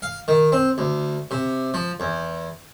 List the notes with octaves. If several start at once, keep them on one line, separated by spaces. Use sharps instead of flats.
F5
D#3
C4
D2
C3
F3
E2